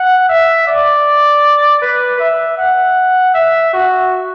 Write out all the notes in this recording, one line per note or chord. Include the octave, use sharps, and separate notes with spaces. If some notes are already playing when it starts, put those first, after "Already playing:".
Already playing: F#5
E5
D5
B4
E5
F#5
E5
F#4